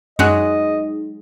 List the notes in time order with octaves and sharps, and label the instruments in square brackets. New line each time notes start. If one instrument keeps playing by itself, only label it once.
[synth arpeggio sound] F#2 F#6 [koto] F#3 G#3 F#4 [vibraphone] D#4 [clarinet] D#5